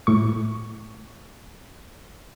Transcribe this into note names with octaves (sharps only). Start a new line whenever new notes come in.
A2 C#6